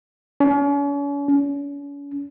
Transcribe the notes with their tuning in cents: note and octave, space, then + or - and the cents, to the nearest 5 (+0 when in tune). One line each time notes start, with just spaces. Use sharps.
C#4 +40
C#4 +40